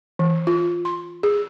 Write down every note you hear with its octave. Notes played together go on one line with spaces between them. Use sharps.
E3
F4
C6
G#4